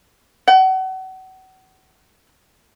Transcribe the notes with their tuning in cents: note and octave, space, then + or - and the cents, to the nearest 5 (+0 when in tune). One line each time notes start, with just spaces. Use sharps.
F#5 +35